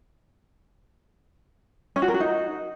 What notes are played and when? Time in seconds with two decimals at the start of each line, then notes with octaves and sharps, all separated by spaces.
1.96 C#4
2.02 F#4
2.08 A#4
2.14 F#4
2.20 D#4